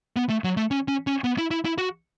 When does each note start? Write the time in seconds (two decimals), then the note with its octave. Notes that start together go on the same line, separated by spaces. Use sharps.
0.16 B3
0.29 A3
0.44 F#3
0.57 A3
0.71 C#4
0.88 C#4
1.07 C#4
1.24 B3
1.38 E4
1.51 E4
1.65 E4
1.78 F#4